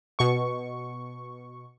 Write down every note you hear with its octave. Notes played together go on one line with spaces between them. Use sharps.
B2 C#6